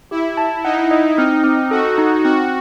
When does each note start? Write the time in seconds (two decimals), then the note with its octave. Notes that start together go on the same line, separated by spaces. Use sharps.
0.11 E4 G4
0.37 A5
0.64 D#4 F#5
0.91 D#5
1.18 C4 D#4
1.44 C4
1.71 F#4 A4
1.98 D#4
2.24 C4 F#4